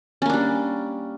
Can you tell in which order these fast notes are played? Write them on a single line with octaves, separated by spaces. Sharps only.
C#4 A#3 D4 G3